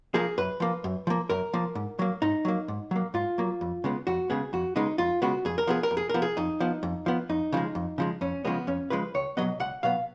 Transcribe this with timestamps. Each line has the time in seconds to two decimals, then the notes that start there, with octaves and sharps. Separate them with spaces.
0.14 F3 A#3 G#4
0.38 F#2 B4
0.60 F3 A#3
0.84 F#2
1.07 F3 A#3
1.29 F#2 A#4
1.53 F3 A#3
1.75 G#2
1.99 F#3 A#3
2.22 G#2 D#4
2.45 F#3 A#3
2.68 G#2
2.91 F#3 A#3
3.14 G#2 F4
3.38 F#3 A#3
3.61 F2
3.84 C#3 G#3 B3
4.07 F2 F#4
4.30 C#3 G#3 B3 G#4
4.53 F2 F#4
4.76 C#3 G#3 B3 D#4
4.98 F2 F4
5.22 C#3 G#3 B3 F#4
5.45 F2 G#4
5.58 A#4
5.67 F3 B3 G#4
5.83 A#4
5.91 F2
5.97 G#4
6.09 F3 B3 A#4
6.22 G#4
6.37 F2 D#4
6.60 F3 B3
6.83 F2
7.06 F3 B3
7.29 F2 D#4
7.52 C#3 F3 G#3
7.75 F2
7.98 C#3 F3 G#3
8.21 F2 C#4
8.45 C#3 F3 G#3 B3
8.67 F2 C#4
8.90 C#3 F3 G#3 B4
9.14 C#2 C#5
9.37 B2 F#3 B3 D#5
9.60 C#2 F#5
9.83 B2 F#3 B3 F5